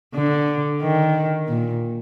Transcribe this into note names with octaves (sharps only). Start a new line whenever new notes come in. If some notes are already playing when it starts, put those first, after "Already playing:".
D3
D#3
A#2